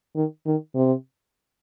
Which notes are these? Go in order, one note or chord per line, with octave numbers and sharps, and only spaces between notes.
D#3
D#3
C3